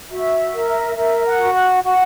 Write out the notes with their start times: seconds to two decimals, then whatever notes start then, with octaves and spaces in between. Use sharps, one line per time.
0.10 F#4 E5
0.54 A#4
0.97 A#4 E5
1.26 F#5
1.40 F#4
1.55 F#5
1.83 F#4 F#5